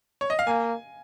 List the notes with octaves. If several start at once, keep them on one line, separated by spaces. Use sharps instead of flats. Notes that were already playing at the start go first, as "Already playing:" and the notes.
C#5
D#5
F5
A#3 G#5